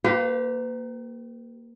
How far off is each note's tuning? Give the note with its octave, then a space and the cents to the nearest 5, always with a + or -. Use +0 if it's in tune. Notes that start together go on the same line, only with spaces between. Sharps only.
A#3 +0 G4 -15 B4 +40